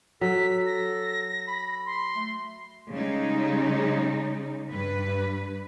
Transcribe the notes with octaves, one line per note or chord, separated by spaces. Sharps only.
F#3 A4 B6
A#6
B5
C6
A3
C#3 G3 G#3 D#4
G2 B4